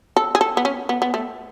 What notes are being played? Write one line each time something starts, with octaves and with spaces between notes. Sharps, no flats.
A4
G#4
A4
B3
C#4
B3
B3
A3